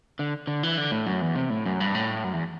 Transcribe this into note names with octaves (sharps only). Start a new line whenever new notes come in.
D3
D3
E3
D3
A2
F#2
E2
C3
A2
F#2
G2
A2
F#2
E2